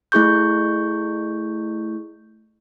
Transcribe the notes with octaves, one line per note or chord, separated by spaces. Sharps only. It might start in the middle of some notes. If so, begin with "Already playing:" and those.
A3 E4 G#4 C#6 G6